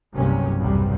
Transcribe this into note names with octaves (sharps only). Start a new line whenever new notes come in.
F#1 C2 G2 C3 F#3 C#4
B1 E2 G2 C3 G3